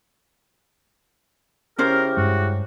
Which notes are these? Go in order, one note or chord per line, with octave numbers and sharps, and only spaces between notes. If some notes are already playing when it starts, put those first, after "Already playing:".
C#3 C#4 E4 G4 A#4 C5
G2 G#3 F#4